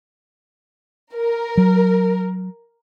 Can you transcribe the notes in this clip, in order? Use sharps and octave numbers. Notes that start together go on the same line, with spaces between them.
A#4
F#3